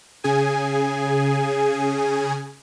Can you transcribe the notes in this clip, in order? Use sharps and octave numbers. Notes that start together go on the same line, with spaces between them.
C#3 G#4 G#5